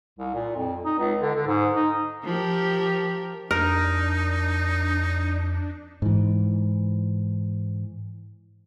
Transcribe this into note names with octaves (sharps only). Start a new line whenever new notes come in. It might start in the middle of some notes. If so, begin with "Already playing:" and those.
C2
A#2
F2
D#4
C#2
D3
D3
G#2
D#4
F3 G4 A#4
F2 D4 D#4 A#4
G#2 E3